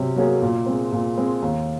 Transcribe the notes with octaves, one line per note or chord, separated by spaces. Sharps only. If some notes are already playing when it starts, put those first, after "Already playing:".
Already playing: C3 F#3 C#4
F#3 A#3 C#4 G#4
A#2
G#3 C4
A#2
G#3 C4
D#2